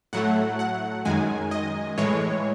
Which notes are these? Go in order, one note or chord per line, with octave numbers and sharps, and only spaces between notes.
A2 F#3 A3 F#5
F#5
F#2 D#3 G#3 G#5
D#5
A2 E3 G#3 C#5